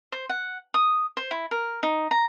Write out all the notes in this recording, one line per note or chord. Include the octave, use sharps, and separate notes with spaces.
C5
F#5
D#6
C5
E4
A#4
D#4
A#5